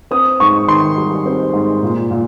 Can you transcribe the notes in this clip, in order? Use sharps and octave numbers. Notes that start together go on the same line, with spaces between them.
C4 D#6
G#2 C#6
D#3 C6
G3
C4
G#2
A#2
A#2